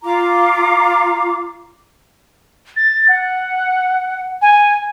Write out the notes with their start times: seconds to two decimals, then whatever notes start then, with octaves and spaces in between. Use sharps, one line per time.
0.03 F4 A#5 D6
2.76 A6
3.08 F#5
4.42 G#5